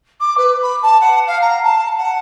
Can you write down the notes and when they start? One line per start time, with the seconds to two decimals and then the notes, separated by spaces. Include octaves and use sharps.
0.20 D6
0.38 B4
0.62 B5
0.83 A5
1.01 F#5
1.27 F5
1.42 A#5
1.64 A5
1.98 F#5